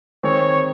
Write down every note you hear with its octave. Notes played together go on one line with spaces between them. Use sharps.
D#3 G#3 C4 C#5